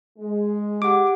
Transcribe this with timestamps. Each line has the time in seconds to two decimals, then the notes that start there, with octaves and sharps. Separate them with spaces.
0.18 G#3
0.82 G4 F#5 D6